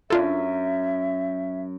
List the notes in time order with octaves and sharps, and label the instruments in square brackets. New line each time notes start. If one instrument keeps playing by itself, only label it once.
[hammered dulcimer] F#2 [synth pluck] D4 F4 A4 [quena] E5